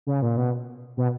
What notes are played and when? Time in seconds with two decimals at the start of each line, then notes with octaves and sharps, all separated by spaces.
0.07 C#3
0.22 A#2
0.37 B2
0.97 B2